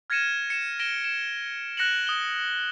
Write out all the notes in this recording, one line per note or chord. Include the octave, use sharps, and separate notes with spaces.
F6 G#6 A#6 C#7 D#7 E7
C#7 E7
A#6 D7 E7 G7
E7
F#6 A#6 C#7 E7 F#7
D#6 G7